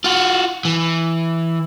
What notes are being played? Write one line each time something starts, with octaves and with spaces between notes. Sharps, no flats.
F4 F#4
E3